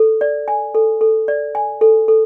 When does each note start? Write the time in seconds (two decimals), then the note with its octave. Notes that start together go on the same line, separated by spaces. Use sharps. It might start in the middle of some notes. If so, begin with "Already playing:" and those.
Already playing: A4
0.21 D5
0.48 G#5
0.75 A4
1.01 A4
1.28 D5
1.55 G#5
1.81 A4
2.08 A4